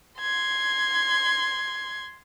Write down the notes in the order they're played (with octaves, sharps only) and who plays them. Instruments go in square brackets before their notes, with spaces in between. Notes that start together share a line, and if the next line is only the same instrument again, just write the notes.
[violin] C6 G#6